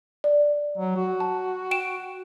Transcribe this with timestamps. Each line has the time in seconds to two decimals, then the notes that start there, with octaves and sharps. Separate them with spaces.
0.24 D5
0.78 F#3
0.97 F#4
1.20 A5
1.71 G5 D7 E7